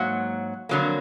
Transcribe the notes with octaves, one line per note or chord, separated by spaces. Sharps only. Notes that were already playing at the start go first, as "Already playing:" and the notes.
Already playing: G#2 F#3 A#3 F#5
F2 D3 F#3 A#3